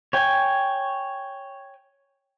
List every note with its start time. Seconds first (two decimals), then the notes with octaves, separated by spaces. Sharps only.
0.13 C#5 G5 G#5